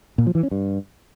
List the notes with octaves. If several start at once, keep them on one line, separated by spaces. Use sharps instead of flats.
A#2
F3
E3
C#4
G2